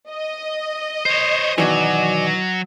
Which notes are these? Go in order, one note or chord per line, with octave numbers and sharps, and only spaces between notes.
D#5
C5 C#5
B2 D#3 E3 F#3 F#4 D5 G#5